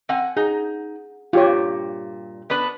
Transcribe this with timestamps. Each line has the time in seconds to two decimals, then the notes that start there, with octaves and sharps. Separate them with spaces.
0.09 C4 F#5 G#5
0.37 D#4 G#4
1.33 G2 A#2 F4 G4 C#5
2.50 B3 D4 B4